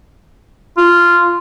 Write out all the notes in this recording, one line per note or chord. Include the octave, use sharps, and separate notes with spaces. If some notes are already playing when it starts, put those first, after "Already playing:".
F4